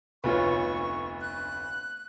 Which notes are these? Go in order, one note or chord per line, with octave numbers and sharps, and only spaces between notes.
F1 D2 B3 F4 C#5 C#6
F#6